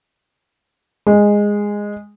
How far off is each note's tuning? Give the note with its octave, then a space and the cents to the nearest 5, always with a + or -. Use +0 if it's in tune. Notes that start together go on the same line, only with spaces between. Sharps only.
G#3 -10